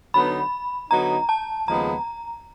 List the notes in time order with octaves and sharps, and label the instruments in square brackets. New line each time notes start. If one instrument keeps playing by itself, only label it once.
[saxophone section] D3 F#3 B3 D#4 [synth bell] B5
[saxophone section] D3 F#3 B3 D#4 [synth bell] A#5
[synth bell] A5
[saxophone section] D#2 C#3 F3 G#3 B3 [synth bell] A#5